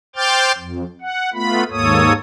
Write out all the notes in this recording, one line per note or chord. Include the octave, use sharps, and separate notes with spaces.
C5 G5 D6 F6 G6 A6
F2
F#5
A3 B3 F4 B5
D#2 G#2 A#3 A4 C#5 D#6